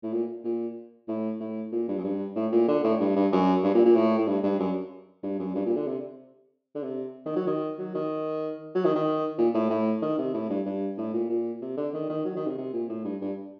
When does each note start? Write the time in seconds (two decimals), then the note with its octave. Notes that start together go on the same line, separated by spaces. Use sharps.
0.03 A2
0.13 A#2
0.44 A#2
1.08 A2
1.40 A2
1.72 A#2
1.88 G2
1.98 F#2
2.04 G2
2.36 A2
2.52 A#2
2.68 D3
2.84 A2
3.00 G2
3.16 G2
3.32 F#2
3.63 G2
3.74 A#2
3.85 A#2
3.95 A2
4.18 A2
4.27 G2
4.43 G2
4.59 F#2
5.23 G2
5.39 F#2
5.55 G2
5.66 A#2
5.76 D3
5.87 C3
6.75 D3
6.83 C3
7.26 D#3
7.36 F#3
7.47 D#3
7.79 F#3
7.95 D#3
8.75 F#3
8.85 D#3
8.95 D#3
9.38 A#2
9.54 A2
9.70 A2
10.02 D#3
10.18 C3
10.34 A2
10.49 G2
10.66 G2
10.98 A2
11.13 A#2
11.29 A#2
11.62 C3
11.77 D3
11.93 D#3
12.09 D#3
12.25 F#3
12.36 D#3
12.47 C3
12.58 C3
12.73 A#2
12.89 A2
13.05 G2
13.21 G2